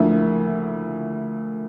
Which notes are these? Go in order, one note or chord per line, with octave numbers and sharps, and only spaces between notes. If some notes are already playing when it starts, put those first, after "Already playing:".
Already playing: D2 D3 F3 A#3 E4